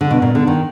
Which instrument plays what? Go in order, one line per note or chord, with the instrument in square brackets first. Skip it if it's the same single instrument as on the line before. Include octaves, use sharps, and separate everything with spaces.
[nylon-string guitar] D3
B2
A#2
D3
D#3